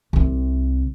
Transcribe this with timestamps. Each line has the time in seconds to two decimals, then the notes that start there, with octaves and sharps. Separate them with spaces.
0.13 C2 C3